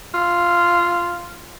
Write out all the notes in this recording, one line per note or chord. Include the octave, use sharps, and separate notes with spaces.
F4